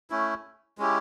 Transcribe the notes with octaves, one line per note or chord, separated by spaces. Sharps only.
A3 C#4 E4
G#3 C#4 E4 G4